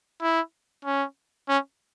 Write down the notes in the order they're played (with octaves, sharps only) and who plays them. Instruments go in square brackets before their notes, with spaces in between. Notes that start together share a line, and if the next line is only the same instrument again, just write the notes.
[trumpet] E4
C#4
C#4